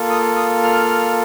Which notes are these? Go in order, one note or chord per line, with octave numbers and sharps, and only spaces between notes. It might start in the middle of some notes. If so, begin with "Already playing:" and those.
Already playing: A#3 F4 A4
D#6
D#6
F6